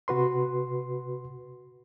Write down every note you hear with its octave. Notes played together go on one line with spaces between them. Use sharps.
C3 F#4 B4 C6